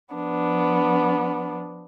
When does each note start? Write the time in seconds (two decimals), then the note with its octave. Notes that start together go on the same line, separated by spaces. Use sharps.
0.12 F3 B3 D4